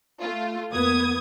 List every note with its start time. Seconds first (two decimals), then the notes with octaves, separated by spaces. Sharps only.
0.21 A3 F4
0.73 F2 A#3 B3 D#6 G#6